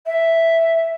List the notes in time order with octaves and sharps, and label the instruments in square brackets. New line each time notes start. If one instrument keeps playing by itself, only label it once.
[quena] E5